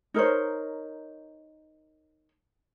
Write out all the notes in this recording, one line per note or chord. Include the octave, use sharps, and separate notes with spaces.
D#4 A#4 C5 C#5